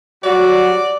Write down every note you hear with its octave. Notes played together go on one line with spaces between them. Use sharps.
F#3 G3 F#4 D5